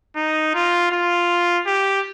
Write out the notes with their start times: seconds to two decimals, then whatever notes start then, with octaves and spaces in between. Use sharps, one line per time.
0.16 D#4
0.54 F4
0.91 F4
1.66 G4